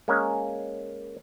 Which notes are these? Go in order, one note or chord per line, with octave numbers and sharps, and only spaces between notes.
G#3 A#3 C#4